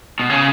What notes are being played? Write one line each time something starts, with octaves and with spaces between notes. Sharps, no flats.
B2
C#3